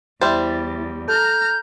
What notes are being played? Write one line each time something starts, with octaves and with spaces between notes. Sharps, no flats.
E2 G3 E4 C5 A6
A4 A#5 F6 G6